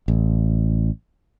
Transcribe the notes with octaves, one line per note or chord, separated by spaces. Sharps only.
A1